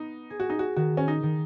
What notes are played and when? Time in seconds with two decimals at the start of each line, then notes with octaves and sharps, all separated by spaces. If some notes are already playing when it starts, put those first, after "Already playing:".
Already playing: B3 D#4
0.30 G#4
0.40 F#4
0.50 D#4
0.59 F#4
0.76 D#3 F#4
0.97 C#4
1.08 D#4
1.23 D#3